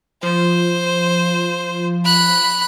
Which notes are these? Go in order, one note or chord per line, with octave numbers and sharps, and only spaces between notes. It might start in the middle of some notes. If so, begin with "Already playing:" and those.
F3 C5
B5 F#6